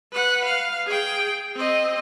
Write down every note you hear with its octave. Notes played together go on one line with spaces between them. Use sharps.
B4 F#5
F5
G#4 G5
C4 D#5